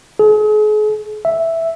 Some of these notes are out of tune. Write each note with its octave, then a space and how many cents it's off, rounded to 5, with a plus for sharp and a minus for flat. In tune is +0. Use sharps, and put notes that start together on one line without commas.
G#4 +40
E5 +0